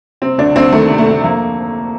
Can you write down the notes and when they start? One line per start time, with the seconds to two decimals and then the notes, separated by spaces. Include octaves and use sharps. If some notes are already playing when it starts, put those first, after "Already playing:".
0.22 C3 C4
0.38 D2 D4
0.56 D2 C4
0.72 D#3 A3
0.89 C3
0.98 A3
1.07 D2
1.23 F2 A#3